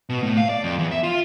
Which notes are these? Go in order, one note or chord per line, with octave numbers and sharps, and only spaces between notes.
B2
A2
F5
D5
F2
E2
E5
F4